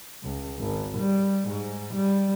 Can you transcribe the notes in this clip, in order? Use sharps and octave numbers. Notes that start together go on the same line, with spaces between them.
C#2
G#1
G3
G#2
G3